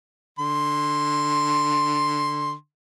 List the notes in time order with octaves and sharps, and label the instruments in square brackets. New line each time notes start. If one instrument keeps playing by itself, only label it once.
[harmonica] D3 C6